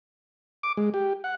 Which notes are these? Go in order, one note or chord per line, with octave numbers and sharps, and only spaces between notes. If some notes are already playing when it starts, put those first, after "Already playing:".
D6
G#3
G4
F#5